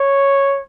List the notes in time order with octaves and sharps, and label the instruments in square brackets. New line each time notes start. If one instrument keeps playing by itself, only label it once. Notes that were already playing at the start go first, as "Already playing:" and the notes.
Already playing: [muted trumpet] C#5